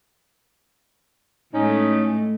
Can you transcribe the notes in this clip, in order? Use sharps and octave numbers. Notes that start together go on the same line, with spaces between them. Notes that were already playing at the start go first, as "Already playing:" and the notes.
A2 G#3 A3 C#4 D#4